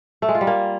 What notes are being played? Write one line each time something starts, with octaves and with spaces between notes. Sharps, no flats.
A3
G#3
F4
G3
A#3